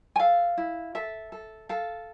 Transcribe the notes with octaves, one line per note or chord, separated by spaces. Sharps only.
G#5
A4 F5
E4
A4 E5
A4
A4 F5